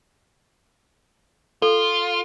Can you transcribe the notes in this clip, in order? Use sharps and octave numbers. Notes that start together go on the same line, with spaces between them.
F4 A4